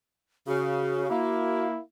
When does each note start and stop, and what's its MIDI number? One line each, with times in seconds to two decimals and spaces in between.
0.47 1.10 49
0.47 1.66 66
1.10 1.78 58
1.10 1.80 64